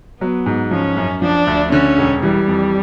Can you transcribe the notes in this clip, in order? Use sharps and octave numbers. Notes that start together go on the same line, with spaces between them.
F#3 B3
G#2
F3 C#4
F#2
F3 D4
D2
D3 C#4
E1
E3 G3
F2